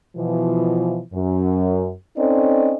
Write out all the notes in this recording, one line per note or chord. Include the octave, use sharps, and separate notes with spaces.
B2 E3 F3
F#2
C4 C#4 D#4 A4 D5 D#5